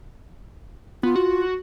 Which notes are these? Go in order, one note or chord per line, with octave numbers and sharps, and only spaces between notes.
B3 F4
F#4